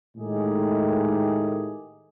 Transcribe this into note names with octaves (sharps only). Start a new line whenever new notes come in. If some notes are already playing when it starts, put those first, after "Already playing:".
A2 D#3 G#3 A3 G4 G#4